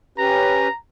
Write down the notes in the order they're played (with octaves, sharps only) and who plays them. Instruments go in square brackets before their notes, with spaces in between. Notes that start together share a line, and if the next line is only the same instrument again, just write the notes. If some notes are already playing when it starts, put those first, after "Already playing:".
[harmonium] C#4 G4 B4 [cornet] A#5